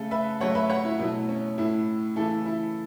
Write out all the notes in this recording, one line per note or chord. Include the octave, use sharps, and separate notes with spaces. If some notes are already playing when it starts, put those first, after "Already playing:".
Already playing: C#3 A3 A4
B4 E5
C#3 F#3 A3 C#5 F#5
B4 E5
C#5 F#5
E4
B2 F#3 A3 E4
C#4
A2 A3 E4
C#3 E3 A3 E4 A4
E4